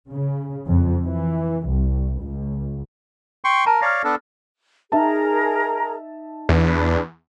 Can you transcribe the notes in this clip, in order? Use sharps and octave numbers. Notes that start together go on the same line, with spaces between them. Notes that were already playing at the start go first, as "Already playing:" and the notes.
C#3
F2
E3
C2
C#2
G5 C6 C#6
A#4 A5 A#5
C#5 D5 F5 F6 A#6
B3 D4 A4
D#4 G#4 A#4 E5 A5 A#5
E2 D4 B4